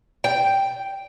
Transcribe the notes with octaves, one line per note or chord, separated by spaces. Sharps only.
G5